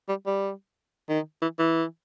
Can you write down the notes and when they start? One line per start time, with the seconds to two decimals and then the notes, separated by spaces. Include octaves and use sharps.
0.09 G3
0.26 G3
1.09 D#3
1.41 E3
1.59 E3